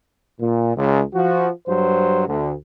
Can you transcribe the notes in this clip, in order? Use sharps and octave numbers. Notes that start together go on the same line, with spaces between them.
A#2
C#2
F3 F#4
G2 F#3 C5
D2 D3